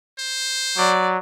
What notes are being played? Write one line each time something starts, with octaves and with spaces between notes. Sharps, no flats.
C5
F#3 D5